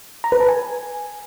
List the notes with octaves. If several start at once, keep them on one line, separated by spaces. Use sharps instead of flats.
A#5
B4
A5
G#5